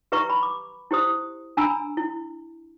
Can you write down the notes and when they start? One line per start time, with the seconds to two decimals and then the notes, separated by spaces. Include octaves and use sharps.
0.12 G4 B4 E5 A#5 C#6
0.30 B5
0.43 D6
0.91 E4 G4 C5 D#6
1.57 D4 G#5 A#5 B5 E6
1.97 E4